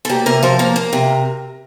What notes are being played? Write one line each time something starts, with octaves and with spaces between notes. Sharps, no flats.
A4
A#3 G4
C3 A#4
F3 C5
A#3 A#4
A#3
C3